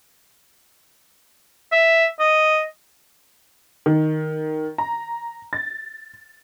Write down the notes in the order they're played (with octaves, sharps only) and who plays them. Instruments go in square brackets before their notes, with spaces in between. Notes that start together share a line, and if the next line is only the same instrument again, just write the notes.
[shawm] E5
D#5
[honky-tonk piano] D#3
A#5
A6